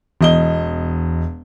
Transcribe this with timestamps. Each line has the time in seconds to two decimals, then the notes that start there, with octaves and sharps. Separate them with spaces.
0.21 E1 E2 D#5 G7